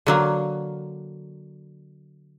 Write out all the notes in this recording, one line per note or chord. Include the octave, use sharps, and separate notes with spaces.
D3 F#3 A#3